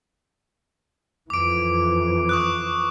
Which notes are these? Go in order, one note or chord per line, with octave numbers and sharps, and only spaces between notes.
F2 E3 D6 D7
C#6 D#6 F#6